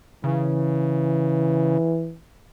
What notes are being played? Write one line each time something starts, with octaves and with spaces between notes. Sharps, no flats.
C#3 E3